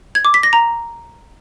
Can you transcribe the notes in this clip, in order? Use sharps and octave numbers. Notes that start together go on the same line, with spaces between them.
G#6
D6
B6
A#6
A#5